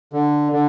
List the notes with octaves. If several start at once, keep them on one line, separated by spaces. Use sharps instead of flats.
D3
D3